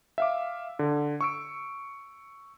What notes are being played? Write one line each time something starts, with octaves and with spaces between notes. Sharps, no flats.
E5 F5 D6
D3
C#6 E6 D7